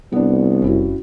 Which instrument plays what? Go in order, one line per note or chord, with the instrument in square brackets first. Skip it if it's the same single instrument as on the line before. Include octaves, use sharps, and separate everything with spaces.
[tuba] C2 [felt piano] B3 D4
[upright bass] F#1 F2 [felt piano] C#4 E4 F#4